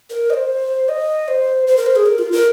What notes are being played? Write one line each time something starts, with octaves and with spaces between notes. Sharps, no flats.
A#4
D#5
C5
D#5
C5
C5
A#4
C5
G#4
A#4
F4
A#4